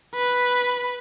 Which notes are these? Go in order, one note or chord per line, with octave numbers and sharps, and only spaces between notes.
B4